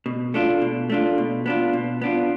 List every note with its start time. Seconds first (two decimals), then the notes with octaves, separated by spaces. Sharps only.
0.06 B2
0.34 A3 D4 F4
0.61 B2
0.90 A3 D4 F4
1.18 B2
1.46 B3 D4 F4
1.73 B2
2.02 B3 D4 F4